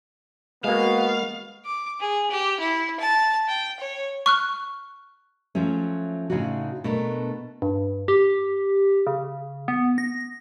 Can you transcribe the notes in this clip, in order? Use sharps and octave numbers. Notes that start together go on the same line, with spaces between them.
G#3 A#3 B3 F#4 F5
D6
G#4
G4
E4
A5
G5
C#5
C#6 F6 F#6
F3 F#3 A3 C#4
A2 C#3 D#4 F4 F#4
B2 A3 D4 A#4
G2
G4
C#3
B3
A#6